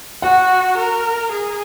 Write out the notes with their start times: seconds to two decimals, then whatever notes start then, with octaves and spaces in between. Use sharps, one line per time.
0.22 F#4 F#5
0.77 A#4
1.31 G#4